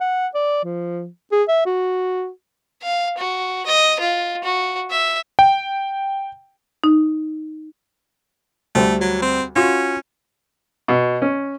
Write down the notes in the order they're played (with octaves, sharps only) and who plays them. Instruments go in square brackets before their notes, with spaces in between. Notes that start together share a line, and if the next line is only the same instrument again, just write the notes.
[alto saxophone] F#5
D5
F3
G#4
E5
F#4
[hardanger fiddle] F5
F#4
D#5
F4
F#4
E5
[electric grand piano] G5
[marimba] D#4
[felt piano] D2 G3 C5 [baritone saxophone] A3
[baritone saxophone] F#3
C4
[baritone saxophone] C#4 [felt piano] F4 F#4
[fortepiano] B2
C#4